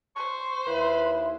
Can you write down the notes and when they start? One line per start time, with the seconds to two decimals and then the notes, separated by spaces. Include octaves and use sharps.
0.16 C5 C#6
0.66 D#2 E4 B4